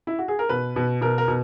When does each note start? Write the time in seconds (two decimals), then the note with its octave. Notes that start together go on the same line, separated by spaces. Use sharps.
0.07 E4
0.19 F#4
0.28 G#4
0.39 A#4
0.49 B2 B4
0.76 B2
1.01 B2 A#4
1.18 A#4
1.28 B2